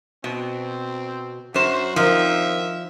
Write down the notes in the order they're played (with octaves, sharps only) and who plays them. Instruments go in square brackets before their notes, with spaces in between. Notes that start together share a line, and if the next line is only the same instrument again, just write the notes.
[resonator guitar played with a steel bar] B2 [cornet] C4
[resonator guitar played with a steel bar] F#2 C5 [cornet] F#4
[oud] D#3 C4 D#4 [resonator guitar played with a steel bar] F3 [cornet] E5